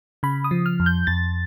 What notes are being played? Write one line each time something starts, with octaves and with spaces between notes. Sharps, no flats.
C#3 B5
D#6
F3
F6
F2
G6
F2 A6